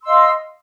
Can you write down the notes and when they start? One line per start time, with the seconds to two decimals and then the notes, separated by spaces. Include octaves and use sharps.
0.02 E6
0.04 C6
0.07 D#5
0.09 F5